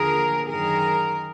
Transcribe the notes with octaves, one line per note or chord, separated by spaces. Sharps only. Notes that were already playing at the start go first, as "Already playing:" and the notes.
Already playing: D#2 D3 F3 G#4 A#4
F#2 D#3 G#4 A#4